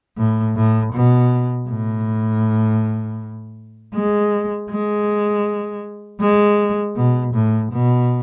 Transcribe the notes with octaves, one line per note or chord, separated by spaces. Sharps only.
A2
A2
B2
A2
G#3
G#3
G#3
B2
A2
B2